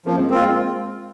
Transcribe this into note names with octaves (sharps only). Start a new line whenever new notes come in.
F3 A#3 C#4
G#3 C4
A#3 C4 F4
G#3